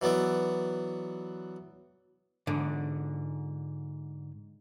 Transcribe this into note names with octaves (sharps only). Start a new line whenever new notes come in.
E3 F#3 B3 D5 E5
G#2 D3